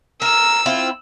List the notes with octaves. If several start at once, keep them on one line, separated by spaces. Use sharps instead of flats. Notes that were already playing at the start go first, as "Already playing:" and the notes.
A#4 E6
C4 E4 F4